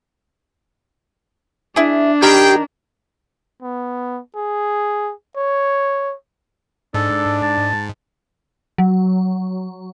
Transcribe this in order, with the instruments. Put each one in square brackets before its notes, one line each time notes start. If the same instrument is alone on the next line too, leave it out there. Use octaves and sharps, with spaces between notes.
[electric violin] D4 [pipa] E4 G#4
[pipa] D#3 A#4 B5 [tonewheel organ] G4 [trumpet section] G#4 C5 G5
[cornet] B3
G#4
C#5
[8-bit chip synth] G#2 [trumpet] D4 [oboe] A4
[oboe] A5
[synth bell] F#3